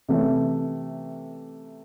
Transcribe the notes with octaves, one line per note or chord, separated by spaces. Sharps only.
C3 E3 A3 C#4